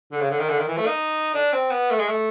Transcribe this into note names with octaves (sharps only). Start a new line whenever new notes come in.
D3
C#3
D3
D#3
D3
D#3
E3
A3
D#4
D4
C4
B3
A3
G#3
A3